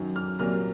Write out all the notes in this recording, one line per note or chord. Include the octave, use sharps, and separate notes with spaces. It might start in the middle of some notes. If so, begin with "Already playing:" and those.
Already playing: F#2 D#3 F#3
F6
C2 A#2 F#3 A#3 F6